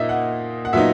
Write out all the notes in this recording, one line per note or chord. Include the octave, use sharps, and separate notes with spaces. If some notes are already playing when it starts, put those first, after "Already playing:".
Already playing: A#2 A#3 D#4 D#5 E5
F#5
F#5
A#2 F#3 B3 D#4 E5